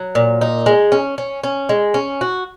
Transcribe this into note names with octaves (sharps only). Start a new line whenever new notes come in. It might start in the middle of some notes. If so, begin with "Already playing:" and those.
Already playing: F#3
A#2
D#4
G#3
C#4
C#4
C#4
G#3
C#4
F#4